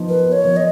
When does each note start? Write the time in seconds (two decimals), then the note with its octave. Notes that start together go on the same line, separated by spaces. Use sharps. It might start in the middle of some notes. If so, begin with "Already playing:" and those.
Already playing: F3 B3 D#4
0.08 A#4 B4
0.27 B3
0.32 C#5
0.45 F3
0.56 D#5